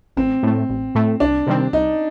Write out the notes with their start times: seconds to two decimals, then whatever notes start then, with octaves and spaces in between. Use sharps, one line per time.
0.17 A1 C4
0.43 A2 A3
0.69 A1
0.95 A2 A3
1.20 C2 D4
1.47 C3 D#3 G3 C4
1.73 C2 D#4